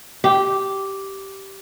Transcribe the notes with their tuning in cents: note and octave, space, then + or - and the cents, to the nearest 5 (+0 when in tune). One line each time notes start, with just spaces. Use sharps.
G4 -10